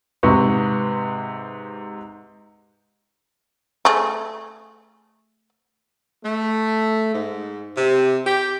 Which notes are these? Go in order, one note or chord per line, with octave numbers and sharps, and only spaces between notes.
G#2 C3 B4 C#6
A3 G#4
A3
G#2
C3
G4